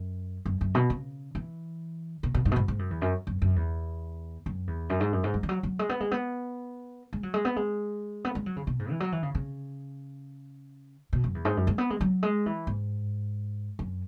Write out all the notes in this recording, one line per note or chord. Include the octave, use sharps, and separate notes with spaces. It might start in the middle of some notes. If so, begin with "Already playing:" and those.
Already playing: F#2
F#2
F#2
B2
C#3
E3
B2
B2
G#2
B2
G#2
G#2
F#2
E2
F#2
F#2
F#2
E2
F#2
E2
F#2
G#2
F#2
G#2
F#3
E3
F#3
F#3
G#3
B3
G#3
B3
G#3
F#3
G#3
B3
G#3
B3
G#3
F#3
C#3
B2
G#2
E3
F#3
E3
C#3
C#3
B2
F#2
E2
G#2
F#2
G#3
B3
G#3
F#3
G#3
E3
G#2
F#2